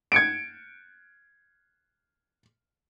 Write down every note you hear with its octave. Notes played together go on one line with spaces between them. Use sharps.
G#6 C#7 D7